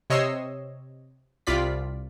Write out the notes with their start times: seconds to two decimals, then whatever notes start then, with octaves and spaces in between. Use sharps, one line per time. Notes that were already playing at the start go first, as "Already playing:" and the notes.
0.10 C3 C#5 D#5 C#6 E6 C7
1.47 C2 F4 D5 B6